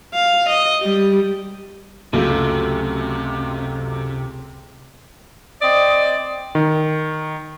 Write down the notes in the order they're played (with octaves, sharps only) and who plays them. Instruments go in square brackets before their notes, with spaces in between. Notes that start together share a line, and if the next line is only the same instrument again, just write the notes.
[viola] F5
D#5
G3
[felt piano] C#2 [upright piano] F#2 A3 [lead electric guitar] C3
[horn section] C4 D5 D#5
[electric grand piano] D#3